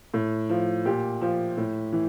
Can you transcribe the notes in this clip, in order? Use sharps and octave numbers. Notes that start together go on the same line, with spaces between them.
A2
F3
A#2 G4
F3
A2
E3